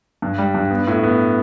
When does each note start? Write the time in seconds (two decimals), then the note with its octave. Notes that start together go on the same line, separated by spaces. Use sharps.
0.22 G2
0.38 G3
0.54 G2
0.71 B3
0.87 A2
1.03 B3